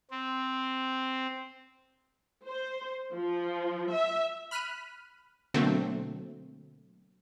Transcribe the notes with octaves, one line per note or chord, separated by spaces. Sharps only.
C4
C5
F3
E5
B5 F6 F#6 B6 D#7
B2 D3 F#3 A3 A#3 C4